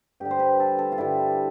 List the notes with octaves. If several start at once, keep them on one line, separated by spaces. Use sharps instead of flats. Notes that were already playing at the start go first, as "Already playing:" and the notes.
G2 D3 G3 G4
C5
B4
A4
A4
F4
G2 D3 G3 E4